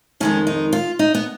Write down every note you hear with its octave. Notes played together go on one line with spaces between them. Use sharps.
F2 D#3 G#3 C#4
D#4
F4
D#4
B3